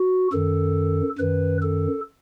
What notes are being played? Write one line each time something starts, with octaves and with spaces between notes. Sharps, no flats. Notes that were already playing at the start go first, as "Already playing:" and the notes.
Already playing: F#4
F#2 D#3 A4
F#2 D#3 B4
A4